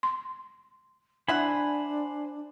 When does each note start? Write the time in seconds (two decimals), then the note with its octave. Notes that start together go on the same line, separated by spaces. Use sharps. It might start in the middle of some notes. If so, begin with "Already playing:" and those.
0.03 C6
1.28 D4 E4 C5 E5 F#5 G#5 B5